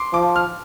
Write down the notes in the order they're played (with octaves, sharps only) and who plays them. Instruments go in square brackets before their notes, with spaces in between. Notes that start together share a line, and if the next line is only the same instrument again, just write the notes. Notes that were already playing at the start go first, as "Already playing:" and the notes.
Already playing: [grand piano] C6 D6
[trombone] F3 [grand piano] D6
[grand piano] F6